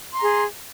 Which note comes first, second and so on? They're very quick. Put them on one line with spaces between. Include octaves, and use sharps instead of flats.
C6 A#5 G#4